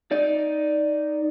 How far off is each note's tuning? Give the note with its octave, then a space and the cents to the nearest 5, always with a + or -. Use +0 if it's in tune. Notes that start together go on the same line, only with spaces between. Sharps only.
D#4 +0 D5 +0